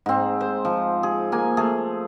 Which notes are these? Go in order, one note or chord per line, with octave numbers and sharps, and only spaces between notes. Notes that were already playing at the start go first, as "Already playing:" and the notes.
G#2 C4
C5
F3
G#4
A#3 G#5
A3 G#4